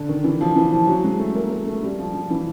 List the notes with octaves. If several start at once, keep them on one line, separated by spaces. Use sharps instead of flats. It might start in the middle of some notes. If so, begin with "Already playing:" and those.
Already playing: D3
D#3
E3
F3
E3
F3
F#3
G#3
A3
A#3
A#3
A3
G3
F3
F3
E3